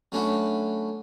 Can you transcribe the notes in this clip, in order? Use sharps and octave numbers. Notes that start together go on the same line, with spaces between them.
F#3 A3 C#4 D4 E4 F#4